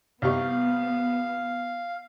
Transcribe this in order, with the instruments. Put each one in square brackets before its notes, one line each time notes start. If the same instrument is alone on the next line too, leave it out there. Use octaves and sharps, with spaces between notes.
[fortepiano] C2 G4 C#6 [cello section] B3 [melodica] F5